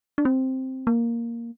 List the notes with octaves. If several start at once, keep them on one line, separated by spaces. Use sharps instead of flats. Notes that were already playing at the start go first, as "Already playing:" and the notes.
D4
C4
A#3